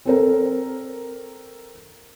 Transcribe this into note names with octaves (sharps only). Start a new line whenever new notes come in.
C4 A4 A#4